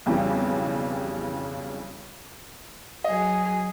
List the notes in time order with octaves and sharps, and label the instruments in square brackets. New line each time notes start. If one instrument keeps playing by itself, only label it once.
[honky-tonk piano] B1 F2 C#3 E3 G3
[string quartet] F#3 G#4 [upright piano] D#5